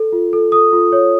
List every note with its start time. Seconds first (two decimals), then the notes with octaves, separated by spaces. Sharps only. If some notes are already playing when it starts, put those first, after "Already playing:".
Already playing: A4
0.13 F4
0.33 A4
0.52 A4 D#6
0.73 F4
0.92 C#5